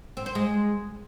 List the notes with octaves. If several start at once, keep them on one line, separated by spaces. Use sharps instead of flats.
C4
C5
G#3